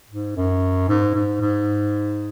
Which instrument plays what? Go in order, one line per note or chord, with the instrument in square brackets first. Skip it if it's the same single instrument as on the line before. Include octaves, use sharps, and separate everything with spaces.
[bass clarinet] G#2
F#2
G#2
G#2
G#2